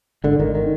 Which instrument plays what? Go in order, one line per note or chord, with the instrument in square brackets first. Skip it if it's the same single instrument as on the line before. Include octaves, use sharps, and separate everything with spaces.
[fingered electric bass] G#1 D3
G#1 D#3
D#3